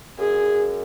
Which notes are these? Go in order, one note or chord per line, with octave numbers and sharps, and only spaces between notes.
F#2 G#4